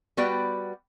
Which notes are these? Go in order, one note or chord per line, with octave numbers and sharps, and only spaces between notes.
G3 B3 F#4 B4 D5 G5